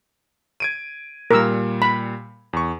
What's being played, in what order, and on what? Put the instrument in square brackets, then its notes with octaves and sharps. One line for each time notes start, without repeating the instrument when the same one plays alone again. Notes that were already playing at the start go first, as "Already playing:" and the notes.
[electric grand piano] G#6 D7 D#7
[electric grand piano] A#2 G3 [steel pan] A#4 E6
[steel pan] B5
[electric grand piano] E2 C#6